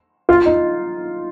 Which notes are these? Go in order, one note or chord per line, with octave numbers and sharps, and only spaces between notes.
F4
D#4